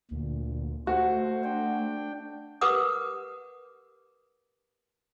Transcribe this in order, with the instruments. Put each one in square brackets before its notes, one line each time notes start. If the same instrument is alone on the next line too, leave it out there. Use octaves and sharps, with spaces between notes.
[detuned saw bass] D2 [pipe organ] A#2
[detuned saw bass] A3 [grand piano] F#4 [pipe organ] C5
[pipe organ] D4 G5
[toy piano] G4 A#4 B4 F#5 D6 D#6